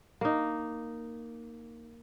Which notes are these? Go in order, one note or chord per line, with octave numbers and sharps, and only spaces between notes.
A#3 D#4